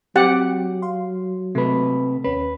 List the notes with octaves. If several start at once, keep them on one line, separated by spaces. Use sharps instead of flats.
F#3 C4 G4 F#5 G5
F5 C6
C3 A3 B4
D#2 C#4 B4